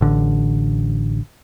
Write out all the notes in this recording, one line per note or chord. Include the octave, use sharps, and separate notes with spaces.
A1 D3